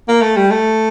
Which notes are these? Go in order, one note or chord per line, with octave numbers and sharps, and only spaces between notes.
A#3
A3
G3
A3